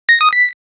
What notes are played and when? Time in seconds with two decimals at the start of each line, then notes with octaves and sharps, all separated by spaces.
0.09 A#6
0.21 D#6
0.33 B6